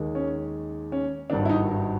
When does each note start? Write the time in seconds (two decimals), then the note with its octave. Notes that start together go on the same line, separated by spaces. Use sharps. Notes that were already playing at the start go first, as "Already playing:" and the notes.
Already playing: D#2 D#3 G#3
0.15 C#4
0.92 C#4
1.30 G#1 G2 D#3 D4
1.45 E4
1.49 D#4